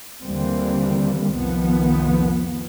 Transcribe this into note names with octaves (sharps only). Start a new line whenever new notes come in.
D#2 D3 E3 G3 A#3 C4
C2 F2 D#3 F3 B3